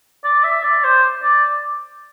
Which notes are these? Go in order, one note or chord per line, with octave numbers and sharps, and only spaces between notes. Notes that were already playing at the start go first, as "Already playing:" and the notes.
D5
E5
D5
C5
D5